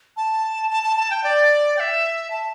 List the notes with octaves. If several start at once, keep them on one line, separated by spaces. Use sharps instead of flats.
A5
A5
A5
A5
G5
D5
G5
E5
A5